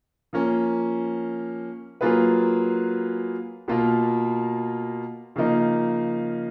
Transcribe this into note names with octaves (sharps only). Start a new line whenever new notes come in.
F3 A#3 C#4
F#3 A#3 F4 G#4 B4
B2 A#3 F4 A#4
C#3 F3 A#3 D#4